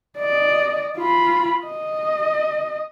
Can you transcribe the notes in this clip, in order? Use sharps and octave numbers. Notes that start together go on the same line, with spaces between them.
D5 D#5
F4 B5
D#5